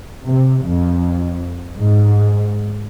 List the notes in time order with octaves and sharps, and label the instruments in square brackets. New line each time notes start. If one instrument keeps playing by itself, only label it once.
[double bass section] C3
F2
G#2